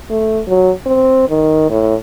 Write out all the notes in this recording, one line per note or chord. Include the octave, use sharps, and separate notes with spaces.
A3
F#3
C4
D#3
A2